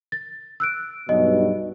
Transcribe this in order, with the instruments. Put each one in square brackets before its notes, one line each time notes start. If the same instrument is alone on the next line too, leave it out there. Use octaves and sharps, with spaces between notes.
[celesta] A6
E6 F#6 D7
[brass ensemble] B1 G2 B2 [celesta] D#5